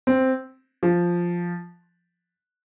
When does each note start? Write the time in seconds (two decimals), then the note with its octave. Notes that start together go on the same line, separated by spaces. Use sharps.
0.07 C4
0.83 F3